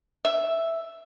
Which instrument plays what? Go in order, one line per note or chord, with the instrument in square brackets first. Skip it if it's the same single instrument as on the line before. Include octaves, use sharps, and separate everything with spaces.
[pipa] E5